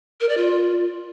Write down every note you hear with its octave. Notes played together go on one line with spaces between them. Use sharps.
A#4
D5
F4